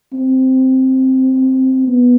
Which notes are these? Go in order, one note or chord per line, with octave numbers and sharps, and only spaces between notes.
C4
B3